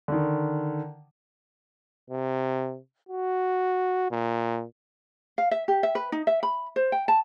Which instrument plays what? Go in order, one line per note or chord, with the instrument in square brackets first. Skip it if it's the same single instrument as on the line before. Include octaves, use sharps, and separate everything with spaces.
[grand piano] D3 D#3
[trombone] C3
F#4
A#2
[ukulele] F5
E5
G4
E5
B4
D#4
E5
B5
C5
G5
A5